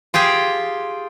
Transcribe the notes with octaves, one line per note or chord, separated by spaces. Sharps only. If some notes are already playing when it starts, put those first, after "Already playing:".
F4 G4 G#4 G5